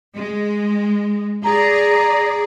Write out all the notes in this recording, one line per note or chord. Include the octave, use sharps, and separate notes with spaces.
G#3
G#4 D5 A#5